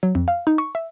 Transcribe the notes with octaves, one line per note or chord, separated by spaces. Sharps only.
F#3
F2
F5
D#4
C#6
E5